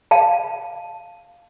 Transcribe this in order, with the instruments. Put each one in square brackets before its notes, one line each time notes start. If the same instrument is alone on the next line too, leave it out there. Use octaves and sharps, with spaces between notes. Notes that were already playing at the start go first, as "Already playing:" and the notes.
[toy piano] F5 A5